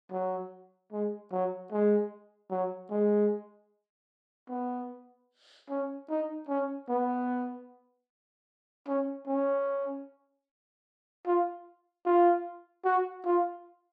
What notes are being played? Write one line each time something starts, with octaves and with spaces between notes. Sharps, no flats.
F#3
G#3
F#3
G#3
F#3
G#3
B3
C#4
D#4
C#4
B3
C#4
C#4
F4
F4
F#4
F4